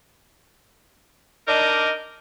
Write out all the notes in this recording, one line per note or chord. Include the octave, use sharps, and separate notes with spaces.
D4 D#4 A#4 D5 D#5